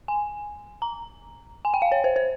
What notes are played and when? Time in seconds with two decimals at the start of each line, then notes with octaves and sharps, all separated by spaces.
0.08 G#5
0.82 A#5
1.65 G#5
1.74 G5
1.82 F5
1.92 C#5
2.04 C5
2.16 C5